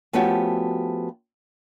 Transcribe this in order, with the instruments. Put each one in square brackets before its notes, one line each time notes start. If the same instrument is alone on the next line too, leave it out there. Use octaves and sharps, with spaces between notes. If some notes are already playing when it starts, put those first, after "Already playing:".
[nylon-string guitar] F3 A3 B3 C#4 F#4 G4